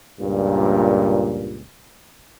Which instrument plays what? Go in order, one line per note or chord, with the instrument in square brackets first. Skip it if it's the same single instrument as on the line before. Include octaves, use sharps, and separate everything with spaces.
[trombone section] C#2 G2 A#2